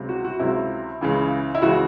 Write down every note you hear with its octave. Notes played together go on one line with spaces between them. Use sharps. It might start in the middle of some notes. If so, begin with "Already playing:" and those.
Already playing: C#2 C3 F#3
F#4
F#4
C#2 C3 F#3 E4
C#2 C#3 E3
E4
C#2 C#3 E3 F#4